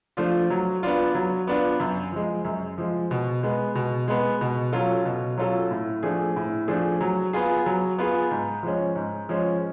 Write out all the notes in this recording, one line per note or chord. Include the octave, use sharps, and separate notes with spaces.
F3 A3 D4 F4
F#3
B3 D4 F4
F#3
B3 D4 F4
F#2
F3 G#3
F#2
F3 G#3
B2
G#3 B3
B2
G#3 B3
B2
F#3 C#4 F4 A4
B2
F#3 C#4 F4 A4
A2
F3 A3 D4 G#4
A2
F3 A3 D4 G#4
F#3
B3 F4 G#4
F#3
B3 F4 G#4
G#2
F3 G#3 C#4
G#2
F3 G#3 C#4